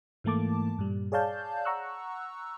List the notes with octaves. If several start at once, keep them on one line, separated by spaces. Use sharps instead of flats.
G#2 E3 A3 A#3 A5 D6
G2 A#2 G3
G#4 C#5 D5 F5 A5 G6
F#5 A#5 C#6 E6 F#6